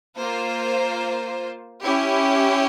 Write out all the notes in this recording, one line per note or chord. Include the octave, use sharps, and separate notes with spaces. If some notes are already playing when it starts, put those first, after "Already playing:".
A#3 F4 C5
C#4 E4 G4